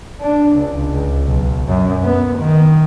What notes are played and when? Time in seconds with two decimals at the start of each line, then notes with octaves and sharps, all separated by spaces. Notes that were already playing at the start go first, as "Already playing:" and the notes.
0.21 D4
0.57 C#2
0.93 C#2
1.27 B1
1.68 F#2
2.04 B3
2.39 D#3